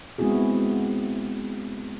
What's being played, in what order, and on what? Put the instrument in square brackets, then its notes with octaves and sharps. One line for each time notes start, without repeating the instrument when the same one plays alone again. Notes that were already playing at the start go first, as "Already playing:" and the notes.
[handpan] G#3 B3 C4 E4 F#4 G#4